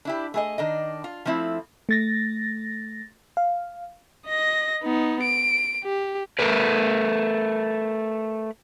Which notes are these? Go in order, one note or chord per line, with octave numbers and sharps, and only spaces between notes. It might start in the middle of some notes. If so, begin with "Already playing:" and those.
D4 E4 G4
A3 G#4 D#5
D#3 D4 D#5
F4
F3 A3 C4 E4
A3 A6 A#6
F5
D#5 A#6
B3 D#4
D7
G4
A3 A#4 B4